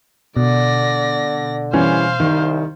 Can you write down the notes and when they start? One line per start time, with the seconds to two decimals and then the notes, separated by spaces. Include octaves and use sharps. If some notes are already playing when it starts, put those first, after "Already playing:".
0.37 B2 D3 D5 A#6
1.73 E3 G3 C#4 C5 F5
2.20 C2 D#3